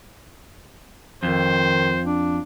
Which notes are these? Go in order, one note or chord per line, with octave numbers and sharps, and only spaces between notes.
F2 D#3 C5
D4